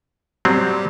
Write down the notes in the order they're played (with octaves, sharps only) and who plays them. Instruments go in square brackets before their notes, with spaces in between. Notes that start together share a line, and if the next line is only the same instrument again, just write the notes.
[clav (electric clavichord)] F#3 C4 [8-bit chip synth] G3